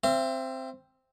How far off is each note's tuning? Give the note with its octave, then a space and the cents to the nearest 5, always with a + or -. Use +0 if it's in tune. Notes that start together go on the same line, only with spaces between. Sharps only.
C4 +0 E5 +40